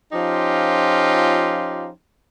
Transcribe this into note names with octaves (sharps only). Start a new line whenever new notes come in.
F3 C#4 D#4 F4 G4